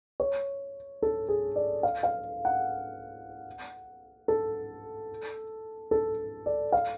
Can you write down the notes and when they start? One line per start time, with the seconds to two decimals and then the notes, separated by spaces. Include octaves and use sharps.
0.20 C#5
1.02 A4
1.28 G#4
1.56 D5
1.83 F5
2.03 F5
2.45 F#5
4.28 A4
5.91 A4
6.46 D5
6.72 F5